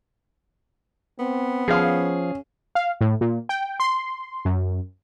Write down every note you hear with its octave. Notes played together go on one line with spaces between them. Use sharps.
B3 C4
F3 C#4 G#4 F5
F5
A2
A#2
G5
C6
F#2